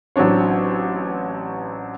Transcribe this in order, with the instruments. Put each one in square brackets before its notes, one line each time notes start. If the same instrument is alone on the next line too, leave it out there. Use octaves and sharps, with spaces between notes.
[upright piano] A1 F#3 C4 D4 C#5